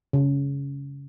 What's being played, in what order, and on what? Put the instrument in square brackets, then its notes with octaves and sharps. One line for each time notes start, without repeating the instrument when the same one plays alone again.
[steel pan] C#3